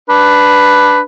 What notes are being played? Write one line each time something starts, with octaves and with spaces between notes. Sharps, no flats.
D4 B4